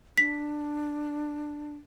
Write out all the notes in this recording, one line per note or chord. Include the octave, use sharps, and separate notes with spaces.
D4 B6